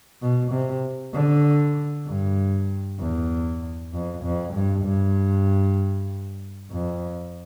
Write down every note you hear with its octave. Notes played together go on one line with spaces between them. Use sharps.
B2
C3
D3
G2
E2
F2
F2
G2
G2
F2